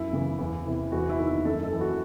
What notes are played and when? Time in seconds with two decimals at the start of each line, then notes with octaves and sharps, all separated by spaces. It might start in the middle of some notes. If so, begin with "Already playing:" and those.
Already playing: F#2 E4
0.13 C#3 E3
0.39 E2
0.65 C3 E3
0.92 E2 F#4
1.09 E4
1.19 D#3
1.27 E4
1.45 F#2 A4
1.63 A4
1.72 E3
1.81 F#4